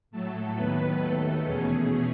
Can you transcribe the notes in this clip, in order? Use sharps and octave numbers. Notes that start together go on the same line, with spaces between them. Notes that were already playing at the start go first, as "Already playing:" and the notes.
A2 F#3 A3 A4
D#2 D#3 F#3 B3 B4
D#2 D#3 A3 A4
E2 B2 A3 C#4 G#4